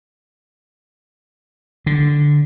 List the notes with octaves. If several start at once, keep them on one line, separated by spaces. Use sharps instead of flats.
D3